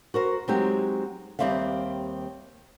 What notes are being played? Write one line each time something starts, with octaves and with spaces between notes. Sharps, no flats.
F#4 A#4 C5
F#3 G#3 C4 D#4 G4
D#2 C3 G3 C4 E5 F5